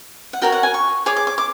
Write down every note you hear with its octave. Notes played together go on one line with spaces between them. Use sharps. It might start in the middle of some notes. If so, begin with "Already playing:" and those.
F#5
F#4 A#4 C#5 G5
F#5
G#5
C#6
G#4 C#5 D6
D6
D6
D6